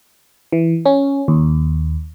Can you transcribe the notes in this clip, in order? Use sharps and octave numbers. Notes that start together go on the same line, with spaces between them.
E3
C#4
D#2